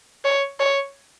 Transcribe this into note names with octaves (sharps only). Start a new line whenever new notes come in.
C#5
C#5